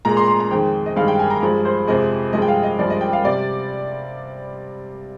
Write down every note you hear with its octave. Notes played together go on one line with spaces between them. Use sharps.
A#2 G#3 A#5
C6
C6
A#5
F2 D#3 G#3 G5
D#5
G2 D#3 G#3 F5
G5
G#5
A#5
G2 F3 G#3
C5
F2 C3 F3 G#3 D#5
G2 F3 G#3 D#5
G5
F5
D#5
G2 F3 G#3 D5
D#5
G5
F5
C3 G3 D5